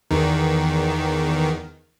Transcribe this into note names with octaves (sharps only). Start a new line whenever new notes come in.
E2 D#3